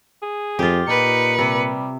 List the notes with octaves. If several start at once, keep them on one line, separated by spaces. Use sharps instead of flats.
G#4
F2 F4 G4
A#2 D#4 B4 C#7
C3 G3